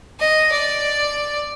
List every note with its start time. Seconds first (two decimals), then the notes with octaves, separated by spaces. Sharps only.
0.20 D#5
0.51 D5